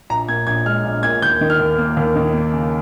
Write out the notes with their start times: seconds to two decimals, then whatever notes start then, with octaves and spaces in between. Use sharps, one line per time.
0.10 A#1 A#5
0.28 A#2 G#6
0.47 A#1 G#6
0.65 G#3 F6
0.85 A#1
1.03 A#2 G#6
1.22 D#2 G6
1.41 D#3
1.50 F6
1.60 D#2
1.78 A#3
1.97 D#2
2.16 D#3
2.33 A#3
2.53 C#3